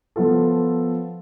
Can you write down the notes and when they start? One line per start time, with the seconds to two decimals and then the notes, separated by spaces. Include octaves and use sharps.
0.16 F3 B3 F4 A4